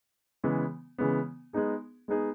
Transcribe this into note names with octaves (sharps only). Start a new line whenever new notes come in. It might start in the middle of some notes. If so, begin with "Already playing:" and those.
C#3 E3 G#3 B3
C#3 E3 G#3 B3
G#3 B3 D#4 G#4
G#3 B3 D#4 G#4